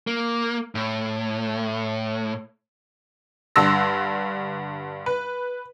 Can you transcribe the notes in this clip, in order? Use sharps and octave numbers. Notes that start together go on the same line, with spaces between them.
A#3
A2
G2 D3 A5 C6 E6 A#6
B4